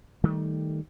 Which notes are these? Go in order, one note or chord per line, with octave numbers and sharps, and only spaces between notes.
D#3 G3 A3